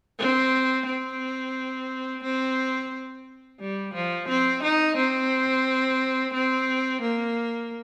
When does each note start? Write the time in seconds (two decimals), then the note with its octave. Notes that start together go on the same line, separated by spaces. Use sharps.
0.19 C4
0.86 C4
2.23 C4
3.60 G3
3.94 F3
4.28 C4
4.63 D#4
4.97 C4
6.34 C4
7.02 A#3